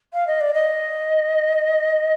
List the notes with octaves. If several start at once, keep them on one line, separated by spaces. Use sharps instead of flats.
F5
D#5
D5
D#5